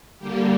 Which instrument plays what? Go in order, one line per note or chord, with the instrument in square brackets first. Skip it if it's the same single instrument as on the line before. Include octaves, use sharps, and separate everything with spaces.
[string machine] D3 G3 A#3 G4